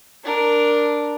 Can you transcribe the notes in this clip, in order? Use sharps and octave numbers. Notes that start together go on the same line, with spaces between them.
D4 A#4